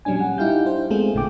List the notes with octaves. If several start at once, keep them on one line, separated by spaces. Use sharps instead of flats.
A#2 F#3 G3 C#4 D4 G#5
G3 F#5
D#4 E4 G4 F5 G6
D4 C5
G#3 A3 B3 C4 F4 G#4
A#1 A#2 D3 G5 D6